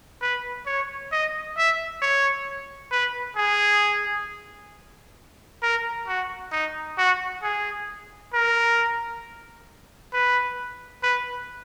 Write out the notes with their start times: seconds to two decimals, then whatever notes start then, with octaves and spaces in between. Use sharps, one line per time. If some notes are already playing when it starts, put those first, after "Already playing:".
0.22 B4
0.66 C#5
1.12 D#5
1.58 E5
2.02 C#5
2.92 B4
3.37 G#4
5.63 A#4
6.08 F#4
6.52 D#4
6.98 F#4
7.43 G#4
8.34 A#4
10.13 B4
11.03 B4